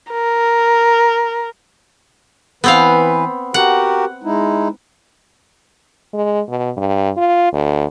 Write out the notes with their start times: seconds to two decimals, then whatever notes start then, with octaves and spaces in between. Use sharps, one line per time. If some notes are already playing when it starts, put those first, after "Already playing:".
0.11 A#4
2.64 E3 B3 C4 B4 F5
3.54 F#4 G4 A#4 F#5
4.23 G#3 D#4 E4
6.14 G#3
6.49 B2
6.77 G2
7.17 F4
7.53 D2